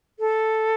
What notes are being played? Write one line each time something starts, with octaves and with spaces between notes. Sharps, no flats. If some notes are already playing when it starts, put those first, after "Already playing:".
A4